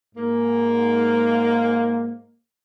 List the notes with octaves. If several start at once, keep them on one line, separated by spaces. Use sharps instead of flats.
G#2 A#3